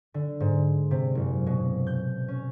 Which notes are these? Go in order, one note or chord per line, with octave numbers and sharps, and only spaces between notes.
D3
G#2
C3
F#1
B2
G6
C#4